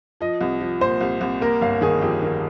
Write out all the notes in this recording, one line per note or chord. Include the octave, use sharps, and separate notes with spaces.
F3 D#5
C2
F3
A#2 C5
C2
C2
A#3 A#4
G1 F5
D#3 G#4
F2 G4
D#3